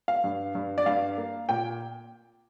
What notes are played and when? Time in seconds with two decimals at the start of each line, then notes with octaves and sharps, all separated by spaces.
0.08 F5
0.24 G2
0.55 G2
0.78 D5
0.86 G2 F5
1.18 A#3
1.49 A#2 G5